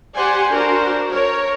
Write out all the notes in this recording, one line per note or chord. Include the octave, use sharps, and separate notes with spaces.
G4 C5 D5 F#5 G#5
D4 F#4 A#4 C5
A#4 C#5